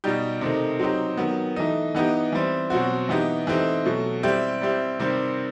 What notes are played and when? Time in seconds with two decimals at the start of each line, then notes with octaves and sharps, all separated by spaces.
0.04 B2 G3 D#4 G4
0.41 C3 D#3 A3 D#4
0.80 F#3 C4 D#4 G4
1.17 D#3 F#3 B3
1.56 E3 A3 D#4
1.95 E3 B3 D#4 G4
2.32 E3 G3 C4
2.70 B2 F#3 C4 F#4
3.09 E3 B3 D#4 G4
3.47 E3 A3 C4 D#4 G4
3.86 B2 F#3 A3
4.23 G3 C4 E4 G4
4.61 G3 C4 E4 G4
4.99 C3 D#3 G3 C4